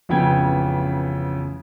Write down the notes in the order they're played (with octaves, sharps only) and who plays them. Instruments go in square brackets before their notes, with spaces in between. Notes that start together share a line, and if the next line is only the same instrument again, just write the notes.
[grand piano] A1 F2 C#3 B3 G5 G#6